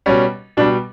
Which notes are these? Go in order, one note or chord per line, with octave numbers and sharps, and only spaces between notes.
B2 G3 C#4
B2 G3 D4